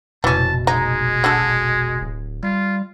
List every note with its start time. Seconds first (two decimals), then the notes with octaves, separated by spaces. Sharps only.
0.24 F1 A#1 B2 E3 C#4 A5
0.67 G#3 D#4
1.24 D3 F#4 A4
2.01 D1
2.43 G3 F4